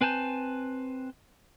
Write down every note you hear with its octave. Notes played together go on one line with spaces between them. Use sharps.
C4 B4 G#5 A5 G6